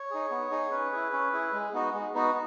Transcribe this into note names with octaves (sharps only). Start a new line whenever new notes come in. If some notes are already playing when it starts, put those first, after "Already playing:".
Already playing: C#5
D#4 G#4
B3
D#4 G#4
C#4 B4
E4 G#4
C#4
E4 G#4
G#3
B3 D#4 F#4
G#3
B3 D#4 F#4